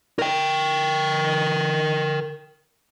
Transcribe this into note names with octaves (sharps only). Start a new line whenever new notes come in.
A#4 G5